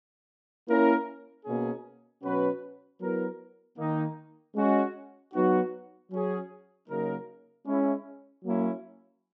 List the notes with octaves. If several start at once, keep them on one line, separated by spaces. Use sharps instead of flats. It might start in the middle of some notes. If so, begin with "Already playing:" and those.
A#3 C#4 E4 A#4
B2 A#3 C#4 G#4
B2 F#3 C#4 F#4 B4
F#3 B3 E4 A#4
D#3 A#3 D#4
G#3 C#4 F#4
F#3 B3 D#4 F#4
F#3 C#4 G#4
C#3 F#3 A#3 D#4 A#4
G#3 C#4 E4
F#3 A#3 C#4 E4